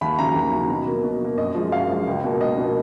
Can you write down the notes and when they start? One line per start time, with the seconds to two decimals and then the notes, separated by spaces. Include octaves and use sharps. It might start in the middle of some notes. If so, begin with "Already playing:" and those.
0.01 D#2 B5
0.18 C#3 F#3 A#5
0.36 D#2
0.53 C#3 F#3
0.70 B2
0.87 F#3 A#3
1.04 B2
1.21 F#3 A#3
1.38 F#2 D#5
1.55 F3 G#3
1.72 F#2 F5
1.90 F3 G#3
2.07 C#2
2.24 B2 A#3
2.41 C#2 D#5
2.57 B2 A#3